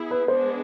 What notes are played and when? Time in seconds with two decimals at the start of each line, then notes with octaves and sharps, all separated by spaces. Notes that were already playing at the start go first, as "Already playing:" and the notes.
Already playing: B3 E4 G#4
0.11 B4
0.28 G#3 B3 D4 C5